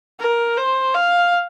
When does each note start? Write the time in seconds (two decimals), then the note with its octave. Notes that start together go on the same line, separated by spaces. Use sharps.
0.20 A#4
0.57 C5
0.94 F5